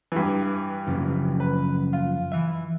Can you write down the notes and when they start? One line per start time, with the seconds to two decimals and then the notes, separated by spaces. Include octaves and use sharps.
0.12 G2 E3
0.87 F#2 C#3 F3
1.40 B4
1.93 F4
2.32 E3 E5